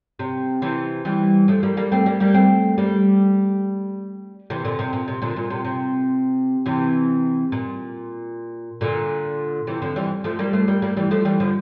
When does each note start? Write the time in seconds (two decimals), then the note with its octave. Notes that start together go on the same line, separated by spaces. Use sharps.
0.19 C3
0.62 C3 E3
1.05 E3 G3
1.48 F3 A3
1.63 G3 A#3
1.77 G3 A#3
1.92 A3 C4
2.06 G3 A#3
2.20 G3 A#3
2.34 A3 C4
2.78 G3 A#3
4.50 C3 E3
4.65 A#2 D3
4.79 C3
4.93 A#2
5.08 C3
5.22 A#2 D3
5.36 A#2
5.50 C3
5.65 C3
6.66 C3 E3
7.52 A#2
8.81 A#2 D3
9.67 C3 E3
9.82 D3 F3
9.96 E3 G3
10.24 F3 A3
10.39 G3 A#3
10.53 A3 C4
10.68 G3 A#3
10.82 G3 A#3
10.97 E3 G3
11.11 F3 A3
11.25 E3 G3
11.40 D3 F3